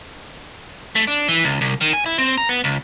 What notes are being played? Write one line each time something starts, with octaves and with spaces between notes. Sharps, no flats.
A3
D4
E3
C#2
C2
D#3
G#5
E4
C4
A#5
B3
C#2